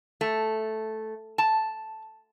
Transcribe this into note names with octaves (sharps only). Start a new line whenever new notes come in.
A3
A5